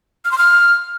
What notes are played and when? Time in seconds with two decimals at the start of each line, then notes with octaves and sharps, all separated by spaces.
0.25 F6
0.31 C6
0.38 F6